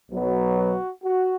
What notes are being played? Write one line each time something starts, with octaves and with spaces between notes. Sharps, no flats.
B1 B2 F#3 B3
F#4
F#4